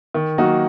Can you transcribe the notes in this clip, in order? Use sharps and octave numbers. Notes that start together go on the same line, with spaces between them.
D#3
F#3 A#3 D#4 F#4